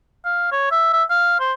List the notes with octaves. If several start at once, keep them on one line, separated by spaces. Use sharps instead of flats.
F5
C#5
E5
E5
F5
C5